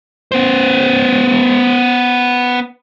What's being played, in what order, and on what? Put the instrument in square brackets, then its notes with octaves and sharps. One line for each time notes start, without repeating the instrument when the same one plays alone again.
[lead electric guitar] B3 C5